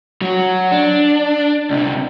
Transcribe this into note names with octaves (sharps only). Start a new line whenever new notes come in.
F#3 F#4
D4
C#2 C3